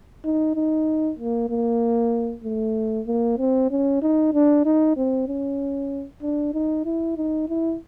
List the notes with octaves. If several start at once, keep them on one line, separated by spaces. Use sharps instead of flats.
D#4
D#4
A#3
A#3
A3
A#3
C4
C#4
D#4
D4
D#4
C4
C#4
D4
D#4
E4
D#4
E4